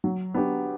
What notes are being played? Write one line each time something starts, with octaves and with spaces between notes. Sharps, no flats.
F#3
B3 D4 G4